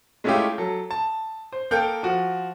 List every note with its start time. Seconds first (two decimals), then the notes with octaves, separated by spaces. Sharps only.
0.24 G#3 A3 C#4 E4 F4 G4
0.58 F#3 A4
0.91 A5
1.52 C5
1.71 A#3 A4 A#4 G5 G6
2.03 F3 F#4